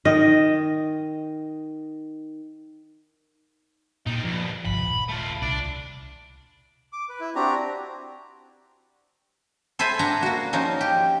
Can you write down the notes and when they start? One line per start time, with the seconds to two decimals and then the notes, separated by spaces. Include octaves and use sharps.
0.05 D#3 D#5
4.06 A#2 G3 D#4
4.24 D2 G2 F3
4.65 G1 C2 B5
4.81 D#1
5.09 A3 F4
5.42 C2 D4 D5
6.93 D6
7.09 B4
7.20 E4
7.36 C4 D4 F#4 G4 A#5
9.79 A4 C5 E5 G#5 B5
9.99 D4 F#5 A#5
10.23 A#3 F#4
10.53 F3 C#4 D#4
10.81 G4